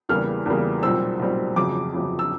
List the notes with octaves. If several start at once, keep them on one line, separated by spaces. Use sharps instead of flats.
E2 C#3 E3 G3 A#3 F6
E2 C#3 E3 G3 A#3
B1 A#2 G3 C4 E6
B1 A#2 G3 C4
G1 F2 C#3 F#3 D6
G1 F2 C#3 F#3
E6